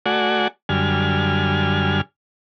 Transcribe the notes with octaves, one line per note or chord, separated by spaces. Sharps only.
A3 F#4 D5 F#5 G#5
F#2 D3 G3 G#5 F6